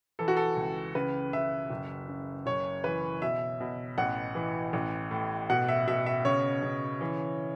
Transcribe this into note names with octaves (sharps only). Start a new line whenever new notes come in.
E3 A4
F#4
A4
C#2
C#3 B4
C#3 E5
F#1
C#3
F#1 C#5
E3 B4
B2 E5
B2
A1 F#5
E3
A1
A2
B2 F#5
E5
B2 E5
E5
C#3 C#5
C#3
E3